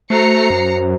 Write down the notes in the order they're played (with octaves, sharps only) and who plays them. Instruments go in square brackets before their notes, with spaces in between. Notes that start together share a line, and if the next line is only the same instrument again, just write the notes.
[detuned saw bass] A3 [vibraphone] F#4 C5 [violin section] A#5 C7 C#7
[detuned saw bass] F#2